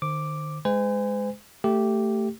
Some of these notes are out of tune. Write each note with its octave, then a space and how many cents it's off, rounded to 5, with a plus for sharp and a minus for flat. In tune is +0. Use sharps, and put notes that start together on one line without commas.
D#3 -40 C5 +0 D6 +0
G#3 +0 C5 -45 G#5 -30
A3 +15 G4 -5